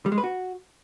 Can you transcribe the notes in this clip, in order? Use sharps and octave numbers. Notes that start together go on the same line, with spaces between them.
G3
G#3
B4
F#4